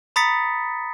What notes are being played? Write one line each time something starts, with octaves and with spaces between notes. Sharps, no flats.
A#5 B5 D#6 A6 B6 C#7